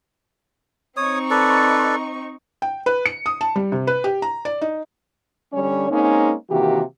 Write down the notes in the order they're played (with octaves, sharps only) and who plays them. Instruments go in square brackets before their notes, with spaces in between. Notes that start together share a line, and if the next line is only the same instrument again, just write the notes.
[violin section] C4 D#4 C#6 [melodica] C#5 D#6
[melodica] A4 B4 D5
[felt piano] G5
B4
C#7
D#6
A5
G3
C3
B4
G4
A#5
D5
D#4
[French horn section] D3 G3 C#4 C#5
G#3 A#3 C4 C#4 D#4
C3 D#3 E3 A#3 F#4 G4